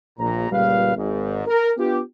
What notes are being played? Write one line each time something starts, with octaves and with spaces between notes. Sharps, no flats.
A#1 A#2 A#5
C#2 A#2 G3 B4 F5
G#1 G#2
A#4
B3 D4 F4 G4